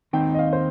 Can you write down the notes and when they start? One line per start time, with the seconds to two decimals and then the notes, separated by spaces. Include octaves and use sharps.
0.13 D#2 D#3 C4 D#4 G5
0.35 D#5
0.39 F5
0.53 C5